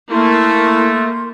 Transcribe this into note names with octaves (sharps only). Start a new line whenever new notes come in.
A3 A#3 E4 A#4 C6 G6